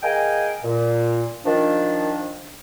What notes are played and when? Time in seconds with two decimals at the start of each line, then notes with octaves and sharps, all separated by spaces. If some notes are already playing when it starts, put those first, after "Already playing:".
0.03 G#4 A#4 D#5 F5 G5 G#5
0.64 A#2
1.46 D#3 F3 D4